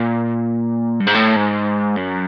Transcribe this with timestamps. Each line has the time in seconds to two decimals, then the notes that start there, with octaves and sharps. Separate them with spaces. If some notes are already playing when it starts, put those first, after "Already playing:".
Already playing: A#2
1.00 G2
1.07 G#2
1.15 A2
1.36 G#2
1.97 F#2